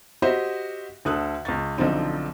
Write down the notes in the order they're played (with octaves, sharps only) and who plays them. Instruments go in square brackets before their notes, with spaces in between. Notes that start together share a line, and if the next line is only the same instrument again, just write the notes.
[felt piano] F#4 G4 C5 D#5 E5
D2 D3 A4 D#6 F#6
C#2 C#6 A6
B1 D3 F3 C4 D#4